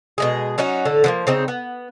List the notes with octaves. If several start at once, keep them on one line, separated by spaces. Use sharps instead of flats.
B2 G#3 G#4
F#3 C#4 D#4 F#4
A2 D3 A4
D3 F3 A#3
C#3 C4 D#4
B3